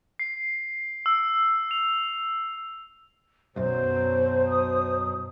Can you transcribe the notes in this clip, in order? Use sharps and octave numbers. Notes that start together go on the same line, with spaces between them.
C7
E6
F7
B1 F#2 B2 F#3 C5
D#6